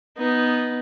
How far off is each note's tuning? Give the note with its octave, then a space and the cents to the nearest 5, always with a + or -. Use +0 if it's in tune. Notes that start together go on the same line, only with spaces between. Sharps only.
B3 +0 D#4 +0